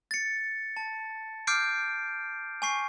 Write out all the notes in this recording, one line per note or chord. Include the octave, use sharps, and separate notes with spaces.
A6 C#7
A5
D6 F6 G6 C7 D7
G#5 C#6 C7